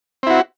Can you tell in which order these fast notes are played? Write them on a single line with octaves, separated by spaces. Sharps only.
C4 E4 F#4